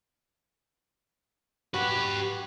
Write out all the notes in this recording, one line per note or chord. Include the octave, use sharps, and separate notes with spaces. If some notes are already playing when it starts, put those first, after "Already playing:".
F#4 G4 B4